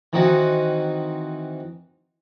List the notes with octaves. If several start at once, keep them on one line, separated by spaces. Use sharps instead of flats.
D#3 E3 C4 D#4 F#4